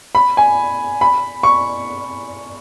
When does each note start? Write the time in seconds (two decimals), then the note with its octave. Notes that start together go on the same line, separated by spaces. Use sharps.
0.15 B5
0.37 G#5
1.01 B5
1.43 C#6